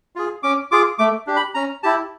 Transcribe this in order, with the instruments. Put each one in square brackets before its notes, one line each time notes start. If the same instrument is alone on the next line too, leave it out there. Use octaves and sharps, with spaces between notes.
[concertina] F4 G#4
C#4 D6
F4 G#4 D6
A3 D6
D4 G4
B5
C#4 A#5
E4 G4 A5